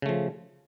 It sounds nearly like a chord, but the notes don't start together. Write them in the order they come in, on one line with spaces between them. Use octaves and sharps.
C#3 A3 F3